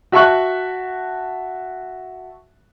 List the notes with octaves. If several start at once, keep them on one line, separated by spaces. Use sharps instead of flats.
F#4 E5 A5 C#6 F#6